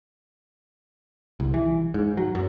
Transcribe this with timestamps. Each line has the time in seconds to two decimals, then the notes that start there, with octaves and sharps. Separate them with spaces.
1.40 C2
1.54 E3
1.94 G#2
2.17 F#3
2.35 F#2